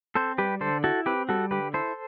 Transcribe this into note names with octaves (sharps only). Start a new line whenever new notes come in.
C4 A4 C5
G3 G4 B4
D3 A4 C5
E4 F#4 A4
C4 G4 B4
G3 F#4 A4
D3 G4 B4
E4 A4 C5